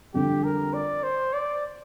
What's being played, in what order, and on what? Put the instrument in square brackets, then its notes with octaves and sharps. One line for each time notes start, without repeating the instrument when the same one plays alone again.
[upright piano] F2 D3 G3 [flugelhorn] G4
[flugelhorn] A#4
D5
C5
D5